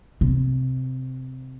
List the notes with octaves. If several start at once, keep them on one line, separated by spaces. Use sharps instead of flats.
C3